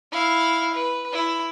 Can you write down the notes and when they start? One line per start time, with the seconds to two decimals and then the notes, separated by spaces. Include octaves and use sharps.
0.12 E4 F5
0.73 B4
1.12 E4